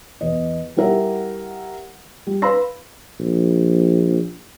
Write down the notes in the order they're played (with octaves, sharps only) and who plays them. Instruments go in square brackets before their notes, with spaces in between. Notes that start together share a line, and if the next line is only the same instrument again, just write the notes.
[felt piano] E2 D#5
G3 E4 G4 A#4 E5 F#5
G3
B4 F5 B5 C6 E6 A#6
[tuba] A#1